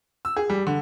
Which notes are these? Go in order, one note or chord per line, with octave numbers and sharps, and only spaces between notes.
E6
G#4
G3
D3